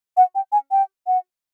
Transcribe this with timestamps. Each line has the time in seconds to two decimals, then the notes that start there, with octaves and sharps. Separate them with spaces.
0.17 F#5
0.35 G5
0.52 G#5
0.71 G5
1.07 F#5